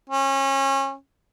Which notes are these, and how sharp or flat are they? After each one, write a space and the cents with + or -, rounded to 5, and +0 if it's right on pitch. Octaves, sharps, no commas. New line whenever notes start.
C#4 -30